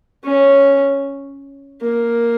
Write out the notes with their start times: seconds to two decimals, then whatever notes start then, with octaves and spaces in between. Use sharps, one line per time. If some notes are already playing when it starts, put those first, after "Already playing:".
0.24 C#4
1.82 A#3